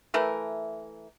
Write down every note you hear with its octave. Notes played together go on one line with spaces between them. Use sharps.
E3 A3 A#4